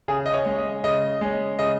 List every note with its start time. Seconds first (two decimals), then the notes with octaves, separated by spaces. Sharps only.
0.08 C#3 G#4
0.26 D#5
0.33 C#5
0.46 G#3 C#4
0.58 D#5
0.84 C#3 D#5
1.21 G#3 C#4
1.59 C#3 D#5